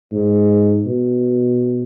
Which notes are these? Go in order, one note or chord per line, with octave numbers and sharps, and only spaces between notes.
G#2
B2